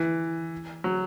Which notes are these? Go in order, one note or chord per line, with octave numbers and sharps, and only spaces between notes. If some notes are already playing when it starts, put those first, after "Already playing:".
Already playing: E3
F#3